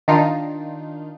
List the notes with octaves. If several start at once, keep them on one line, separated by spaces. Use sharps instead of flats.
D#3 D4 D#4 F4